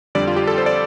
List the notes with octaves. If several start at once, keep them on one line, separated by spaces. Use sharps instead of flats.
F2 D3 G3 D5
F4
G4
A4
C5
D5